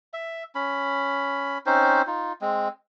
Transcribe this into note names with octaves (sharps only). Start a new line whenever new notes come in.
E5
C#4 B5
C4 C#4 D#4 C5
D#4 F4
G#3 C4